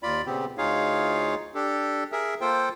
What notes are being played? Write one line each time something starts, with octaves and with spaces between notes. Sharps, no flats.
D#2 F4 D5 B5
A#2 C#3 B3 C4 G4
D2 D#4 F4 G#4 C#5 F5
D4 G4 A4
G#4 A#4 E5
A#3 F4 A4 C5 G5